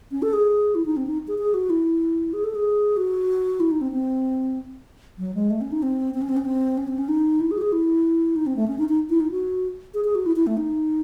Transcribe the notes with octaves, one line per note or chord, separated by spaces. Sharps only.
C#4
A4
G#4
E4
D#4
C4
D#4
G#4
G#4
F#4
E4
G#4
A4
G#4
F#4
E4
D#4
C4
C4
F#3
G#3
A3
C#4
D#4
C4
C4
C#4
C4
C#4
C4
C#4
C4
C#4
D#4
E4
G#4
F#4
G#4
E4
D#4
C4
A3
C#4
D#4
D#4
E4
D#4
F#4
G#4
G#4
F#4
E4
E4
A3
D#4